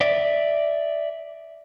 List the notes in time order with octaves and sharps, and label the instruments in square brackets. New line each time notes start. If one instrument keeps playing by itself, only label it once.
[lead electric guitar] D5 E5